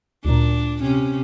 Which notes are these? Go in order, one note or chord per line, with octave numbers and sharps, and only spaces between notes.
D2 A#2 D4
C3 C#4